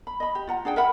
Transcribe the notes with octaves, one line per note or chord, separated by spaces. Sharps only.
B5
D#5 B5
G4
F4 F#5 A#5
D4 G#4 F#5 G5
A#4 E5 F#5 B5